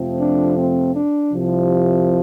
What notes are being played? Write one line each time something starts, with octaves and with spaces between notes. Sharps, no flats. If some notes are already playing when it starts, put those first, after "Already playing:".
Already playing: F2 C3 F3 A3 C4
D4
C4
D4
C2 C3 F3